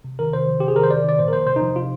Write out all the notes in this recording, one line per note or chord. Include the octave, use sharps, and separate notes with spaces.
C3
D#3 A#4
C3 C5
F3
C3 G4
G#4
D#3 A#4
C5
C3 D5
D#3 D5
A#2 C5
A#4
F3 C5
C3 C5
D#4
F3
C3 F4